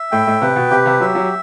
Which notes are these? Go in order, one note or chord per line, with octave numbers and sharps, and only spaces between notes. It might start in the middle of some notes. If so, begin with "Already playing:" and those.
Already playing: E5
A2 G5
A2
C3 B4
B2
C3 G4
C3
F#3 E5
F#3